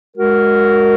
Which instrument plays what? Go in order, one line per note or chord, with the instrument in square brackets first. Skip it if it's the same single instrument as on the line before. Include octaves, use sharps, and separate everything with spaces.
[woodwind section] G#3 F#4 A#4